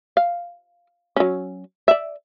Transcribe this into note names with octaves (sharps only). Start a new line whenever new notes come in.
F5
F#3 C#4
D5 E5